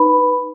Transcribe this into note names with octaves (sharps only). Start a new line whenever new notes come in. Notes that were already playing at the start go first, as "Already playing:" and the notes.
Already playing: D#4 B4 B5